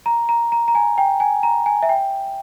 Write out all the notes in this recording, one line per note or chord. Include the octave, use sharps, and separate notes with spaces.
A#5
A#5
A#5
A#5
G#5
G5
G#5
A#5
G#5
E5
G5